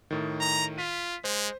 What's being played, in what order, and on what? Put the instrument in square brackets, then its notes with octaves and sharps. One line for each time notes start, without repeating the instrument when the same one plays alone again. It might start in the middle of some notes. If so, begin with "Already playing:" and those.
[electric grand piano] A2 D#3
[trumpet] A#5
[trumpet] F4 [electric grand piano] B6 D#7
[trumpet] G#3 [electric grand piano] C5